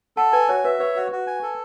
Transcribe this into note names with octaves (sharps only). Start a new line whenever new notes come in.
A4 F#5 A5
B4 G#5
F#4 C#5
B4 E5
B4 C#5
F#4
F#4
G#5
A4